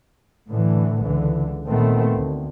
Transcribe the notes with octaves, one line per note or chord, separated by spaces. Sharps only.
A2 D3 E3
C#2 D3 E3
A#2 D#3 A3 B3 C4
D2